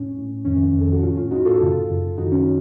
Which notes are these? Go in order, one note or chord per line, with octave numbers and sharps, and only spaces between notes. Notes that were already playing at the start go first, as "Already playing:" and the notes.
Already playing: A2 C#4
A2
F2 D#3 C#4
F2 D#3
A4
F#4
A2 C#4 F4
C#4 F4
A2 D#4 F#4
F4 A4
F#2 C#3
F#2 C#3
F#2 D#3 D#4 F#4
C#4